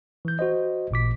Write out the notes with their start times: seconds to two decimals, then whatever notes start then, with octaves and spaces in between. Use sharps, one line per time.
0.25 E3 G6
0.39 F#4 C5 D#5
0.91 A1 A#2 D6 B6